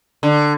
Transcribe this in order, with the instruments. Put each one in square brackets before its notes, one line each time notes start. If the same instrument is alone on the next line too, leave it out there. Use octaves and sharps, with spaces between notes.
[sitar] D3